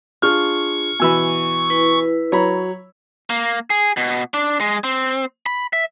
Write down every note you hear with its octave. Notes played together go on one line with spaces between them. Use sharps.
D4 F4 G#4 C#6 F6
B2 E3 G#5 B5 E6
E4 B4
F#3 C#5 A#5 B5
A#3
G#4
B2
D4
G#3
C4
B5
E5